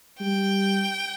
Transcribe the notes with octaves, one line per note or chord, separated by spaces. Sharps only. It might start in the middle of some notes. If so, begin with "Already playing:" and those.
G3 G5